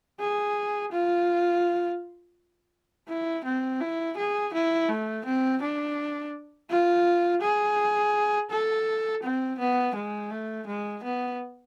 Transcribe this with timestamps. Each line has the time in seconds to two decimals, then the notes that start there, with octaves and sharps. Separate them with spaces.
0.20 G#4
0.92 F4
3.08 E4
3.45 C4
3.81 E4
4.17 G#4
4.53 E4
4.89 A3
5.25 C4
5.62 D4
6.70 F4
7.42 G#4
8.50 A4
9.22 C4
9.59 B3
9.95 G#3
10.31 A3
10.67 G#3
11.03 B3